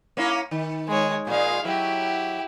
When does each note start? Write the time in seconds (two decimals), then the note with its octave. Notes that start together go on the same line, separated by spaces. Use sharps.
0.17 A#3 C#4 E4
0.51 D#3
0.88 G#3 C#5
1.27 A#2 G#3 G#4 F5
1.65 F#3 E4 G4